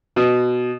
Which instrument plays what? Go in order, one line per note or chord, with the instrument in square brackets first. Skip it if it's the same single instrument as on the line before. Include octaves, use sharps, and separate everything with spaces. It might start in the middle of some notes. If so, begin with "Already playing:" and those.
[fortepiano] B2